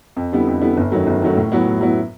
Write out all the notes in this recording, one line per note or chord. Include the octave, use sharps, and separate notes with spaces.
F2
D3 G3 B3 E4
F2
D3 G3 B3 E4
G1
F#2 D#3 F#3 A3
G1
F#2 D#3 F#3 A3
A2
F#3 B3 E4
A2
F#3 B3 E4